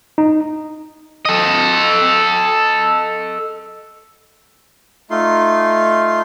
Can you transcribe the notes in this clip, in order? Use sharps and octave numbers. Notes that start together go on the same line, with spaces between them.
D#4
A4 D#5
A3 D#4 F4 C6